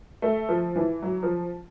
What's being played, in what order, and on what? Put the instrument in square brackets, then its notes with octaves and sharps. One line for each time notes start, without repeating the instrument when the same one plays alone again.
[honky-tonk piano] A3
F3
E3
F#3
F3